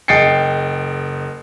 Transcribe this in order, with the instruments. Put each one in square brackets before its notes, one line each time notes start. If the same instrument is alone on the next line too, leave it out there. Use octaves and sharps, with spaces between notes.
[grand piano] F#1 D#5 G5 A6 C7 C#7